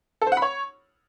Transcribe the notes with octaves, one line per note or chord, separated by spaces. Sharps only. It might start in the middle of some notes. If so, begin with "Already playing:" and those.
A4
C5
F#5
B5
C#5